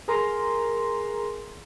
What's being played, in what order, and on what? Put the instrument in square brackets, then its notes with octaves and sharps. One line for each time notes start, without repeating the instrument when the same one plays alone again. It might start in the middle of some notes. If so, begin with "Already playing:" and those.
[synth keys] G#4 A#4 A#5 C6